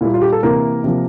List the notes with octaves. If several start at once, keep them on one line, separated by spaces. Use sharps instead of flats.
A#2 G3 A#3 E4
F4
G4
A4
C3 E3 A#3 A#4
C3 F3 A#3